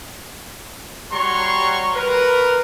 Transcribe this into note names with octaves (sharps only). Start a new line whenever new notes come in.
G3 F#4 C#5 A#5 C6 C#6
A#4 B4